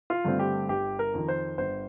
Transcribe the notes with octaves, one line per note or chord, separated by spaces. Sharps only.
F4
G2 D3 A3 C4
G4
G1 G4
A#4
F2 D#3
C5
G1 C5